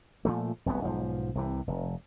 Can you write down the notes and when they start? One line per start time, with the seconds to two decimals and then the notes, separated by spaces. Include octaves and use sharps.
0.25 A#2 F3 A3
0.66 F1 C2 F#2 B3
0.85 B1 G#2 F3
1.35 C2 C3 E3
1.68 F1